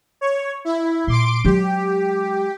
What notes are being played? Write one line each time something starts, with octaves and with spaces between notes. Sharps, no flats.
C#5
E4
A#2 C6 D6 D7
F#3 G#3 G4